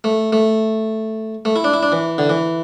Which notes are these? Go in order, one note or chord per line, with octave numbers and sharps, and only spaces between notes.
A3
A3
A3
E4
D4
E4
D4
E3
D3
E3